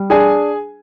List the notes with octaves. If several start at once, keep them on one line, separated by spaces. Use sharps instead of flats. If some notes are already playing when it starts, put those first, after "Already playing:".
Already playing: G3
D4 G#4 G#5